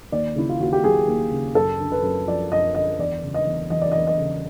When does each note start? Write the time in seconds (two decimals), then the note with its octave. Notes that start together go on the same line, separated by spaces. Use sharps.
0.12 D#2 D5
0.35 C#3 E4
0.49 F4
0.60 D#2 F#4
0.73 G4
0.84 F#3 G#4
1.07 D#2
1.32 C#3
1.55 F#2 A4
1.79 D3
1.92 B4
2.03 F#2
2.27 F3 D5
2.52 F#2 D#5
2.75 D3 D#5
2.99 E2 D5
3.23 C#3
3.34 D#5
3.47 E2
3.70 E3 D#5
3.82 D5
3.92 D#5
3.95 E2
4.07 D#5
4.19 C#3